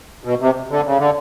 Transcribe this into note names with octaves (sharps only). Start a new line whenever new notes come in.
B2
C3
D3
C#3
D3